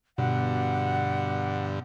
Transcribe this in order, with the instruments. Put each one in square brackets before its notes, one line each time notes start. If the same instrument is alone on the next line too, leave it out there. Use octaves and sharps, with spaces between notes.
[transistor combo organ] G2 D3 [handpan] B2 [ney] F#5